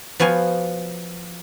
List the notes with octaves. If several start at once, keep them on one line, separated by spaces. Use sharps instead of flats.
F3 B3 F#4 F5 G#5